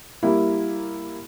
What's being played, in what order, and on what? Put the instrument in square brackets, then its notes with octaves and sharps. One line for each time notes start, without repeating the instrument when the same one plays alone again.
[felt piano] G3 A#3 E4